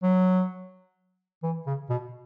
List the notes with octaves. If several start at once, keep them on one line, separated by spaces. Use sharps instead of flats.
F#3
E3
C#3
B2